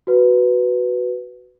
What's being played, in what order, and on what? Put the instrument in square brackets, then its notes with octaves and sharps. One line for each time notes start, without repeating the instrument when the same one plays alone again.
[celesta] F#4 B4